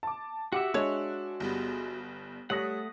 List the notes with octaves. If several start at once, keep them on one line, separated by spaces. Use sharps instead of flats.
A5 D6
F#4 G4 E5 F#5 D6 C#7
G#3 D4 C#5
G1 G3 B3
G3 A3 C#5 F#5 D#6 A#6